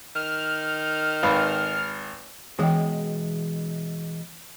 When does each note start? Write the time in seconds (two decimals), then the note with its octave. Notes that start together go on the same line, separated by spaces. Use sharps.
0.15 D#3 F6
1.23 G#1 B4 F5
2.59 E2 B2 E3 G#3 G5